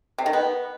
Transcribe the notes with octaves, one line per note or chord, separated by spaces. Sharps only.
C3
D#3
B3